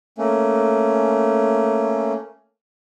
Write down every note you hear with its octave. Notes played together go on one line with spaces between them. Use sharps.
A3 A#3 C#4